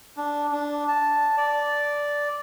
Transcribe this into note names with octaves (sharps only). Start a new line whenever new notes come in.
D4
D4
A5
D5